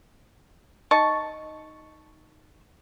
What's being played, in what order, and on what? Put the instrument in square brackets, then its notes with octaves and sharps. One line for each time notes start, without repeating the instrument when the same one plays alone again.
[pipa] D#4 A5 C#6